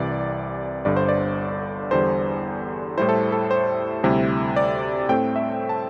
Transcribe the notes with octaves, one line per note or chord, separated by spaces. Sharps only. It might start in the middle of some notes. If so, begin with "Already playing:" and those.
Already playing: C2 C3 E3 D5
G1 G2 D3 D5
C5
D5
E2 D3 G3 C5
A2 G3 E4 C5
A4
A4
C5
D2 C3 G3 E4
D5
A2 A3 C4 G5
E5
A5